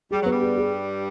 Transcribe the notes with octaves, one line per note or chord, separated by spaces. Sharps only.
G3 G#4
F#3 B3
G2 G3
G#4
G#4